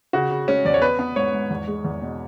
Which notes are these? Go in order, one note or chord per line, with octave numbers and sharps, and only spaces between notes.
C#3 F#4
C#3
G#3 C#4
E2 D5
C#5
B3 B4
B3
G#2 C#5
G#2
E2
G#3
E2
B2